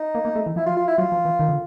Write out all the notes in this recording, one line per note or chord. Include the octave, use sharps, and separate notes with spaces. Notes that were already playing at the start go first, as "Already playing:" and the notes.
Already playing: D#4
A#3
A#3
A3
E3
F3 E4
F4
F4
E4
F#3 F4
F3
E3
D#3
D3